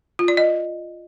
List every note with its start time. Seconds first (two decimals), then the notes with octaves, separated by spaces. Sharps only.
0.19 F4
0.28 D5
0.37 D#5